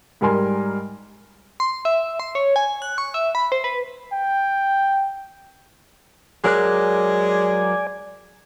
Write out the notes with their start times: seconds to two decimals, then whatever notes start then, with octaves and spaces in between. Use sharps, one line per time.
0.21 G#2 G3 A#4 G#5 C6
1.60 C6
1.85 E5
2.20 C6
2.35 C#5
2.56 G#5
2.82 F#6
2.98 C#6
3.14 E5
3.35 B5
3.52 C5
3.64 B4
4.12 G5
6.44 F#3 G#3 A#4 D5 G#5 F#6